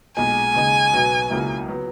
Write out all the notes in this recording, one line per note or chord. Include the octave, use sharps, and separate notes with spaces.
B1 A#2 G#3 G#5
D#2 C#3 G#3 D#4
B1 B2 F#3 B3 F#4
C#2 C#3 F#3 A#3 E4
F#3 B3